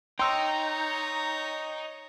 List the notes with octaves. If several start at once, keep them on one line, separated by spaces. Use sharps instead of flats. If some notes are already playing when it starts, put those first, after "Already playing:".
D#4 C#5 G5 A#5 C6 E6